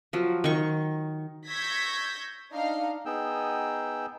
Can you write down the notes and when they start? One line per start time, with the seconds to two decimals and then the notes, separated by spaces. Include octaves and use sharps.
0.13 F3 F#3
0.44 D#3 C#6
1.48 C#6 E6 G6 G#6 A#6 B6
2.53 D4 D#4 F5
3.06 B3 D#4 G#4 G5 E6